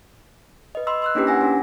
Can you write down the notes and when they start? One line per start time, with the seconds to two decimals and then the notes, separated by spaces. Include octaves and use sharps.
0.75 B4 D#5
0.87 D#5 B5 C6 E6
1.02 C6 E6 F#6
1.15 A#3 C#4 D4 E4 G4 B4
1.27 F#5 G#5 A#6
1.41 C#4 D4